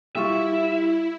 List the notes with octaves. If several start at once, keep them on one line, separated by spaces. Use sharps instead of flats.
G3 E4 F4 E5 C#6